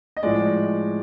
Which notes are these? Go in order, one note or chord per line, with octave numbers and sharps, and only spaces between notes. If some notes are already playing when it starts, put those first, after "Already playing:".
D#5
A2 F3 G#3 D5